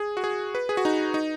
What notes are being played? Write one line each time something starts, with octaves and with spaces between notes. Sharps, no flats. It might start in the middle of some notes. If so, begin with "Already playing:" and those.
Already playing: G#4
F#4
G#4
B4
G#4
F#4
D#4
D#4